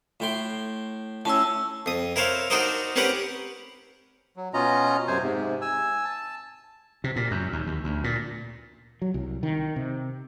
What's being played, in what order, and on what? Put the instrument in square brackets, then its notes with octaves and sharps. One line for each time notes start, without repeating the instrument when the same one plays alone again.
[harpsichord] A2 G5 C6
[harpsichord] A2 C#4 [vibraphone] A5 E6
[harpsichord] F2 D#6
E4 A#4 C5 C#5 F5
D4 D#4 F#4 A#4 C5 D#5
C4 C#4 G4 A#4 B4 F#5
[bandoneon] F#3
B2 C#4 F4 D#5 A#5
F#2 C3 C5 G#5
G#2 C3
G#5 E6
A5
[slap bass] C3
A#2
F#2
D#2
D#2
D2
A#2
[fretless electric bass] F#3
C2
D#3
C3